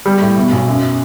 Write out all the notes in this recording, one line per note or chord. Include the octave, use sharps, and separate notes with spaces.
G3
A2
B2
B1
F#2